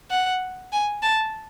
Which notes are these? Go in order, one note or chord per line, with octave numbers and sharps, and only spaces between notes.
F#5
G#5
A5